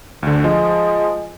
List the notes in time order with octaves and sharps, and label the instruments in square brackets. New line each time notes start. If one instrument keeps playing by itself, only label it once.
[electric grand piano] D2 D3
[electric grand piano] F3 [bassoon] G#3